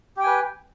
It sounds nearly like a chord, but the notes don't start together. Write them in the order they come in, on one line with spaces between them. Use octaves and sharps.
G4 G5 G#5 B4